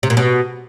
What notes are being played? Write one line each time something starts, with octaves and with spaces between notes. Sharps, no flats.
C3
A#2
B2